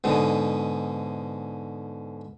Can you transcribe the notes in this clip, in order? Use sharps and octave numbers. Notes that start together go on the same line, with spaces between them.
G#2 B2 D3 D#6